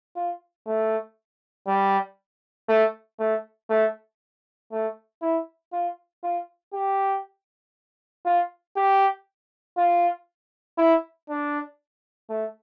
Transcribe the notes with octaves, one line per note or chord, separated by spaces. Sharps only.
F4
A3
G3
A3
A3
A3
A3
E4
F4
F4
G4
F4
G4
F4
E4
D4
A3